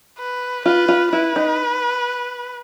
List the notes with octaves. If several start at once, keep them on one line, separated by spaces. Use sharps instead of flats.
B4
F4 B4
F4
E4 B4
D#4